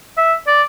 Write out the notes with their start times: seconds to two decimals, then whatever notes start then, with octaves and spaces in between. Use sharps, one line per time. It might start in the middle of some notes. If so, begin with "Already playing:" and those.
0.17 E5
0.47 D5